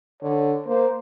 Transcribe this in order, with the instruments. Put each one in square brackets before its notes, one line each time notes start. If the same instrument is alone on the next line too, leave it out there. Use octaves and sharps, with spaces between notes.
[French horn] D3 [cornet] C#5
[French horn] A#3 [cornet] C5